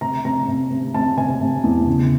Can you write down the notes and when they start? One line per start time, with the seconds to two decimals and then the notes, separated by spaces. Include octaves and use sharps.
0.01 C3 A#5
0.25 C3 A#5
0.48 C3
0.70 C3
0.94 C3 A5
1.18 C3 G#5
1.41 C3
1.64 E2
1.87 C#3